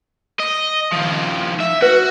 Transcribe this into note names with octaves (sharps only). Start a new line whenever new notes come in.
D#5
D#3 F3
E5
F#4 B4